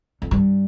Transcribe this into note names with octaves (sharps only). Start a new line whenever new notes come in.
F2
G2